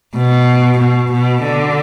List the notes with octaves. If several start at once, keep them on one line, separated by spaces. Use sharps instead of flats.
B2
B2
B2
D3